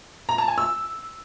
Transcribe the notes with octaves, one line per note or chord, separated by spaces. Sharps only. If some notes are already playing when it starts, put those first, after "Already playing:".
A#5
A5
G#5
E6